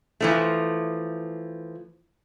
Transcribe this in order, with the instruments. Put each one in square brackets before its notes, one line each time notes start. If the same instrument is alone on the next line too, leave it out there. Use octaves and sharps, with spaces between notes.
[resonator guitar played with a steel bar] E3 F3 A3